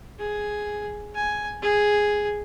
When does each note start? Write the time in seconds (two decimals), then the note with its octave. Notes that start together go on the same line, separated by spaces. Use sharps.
0.19 G#4
1.15 G#5
1.62 G#4